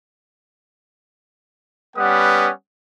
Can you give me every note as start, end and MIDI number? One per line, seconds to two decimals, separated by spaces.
1.97 2.50 55
1.97 2.50 59
1.97 2.50 61
1.97 2.50 71
1.97 2.50 78
1.97 2.50 87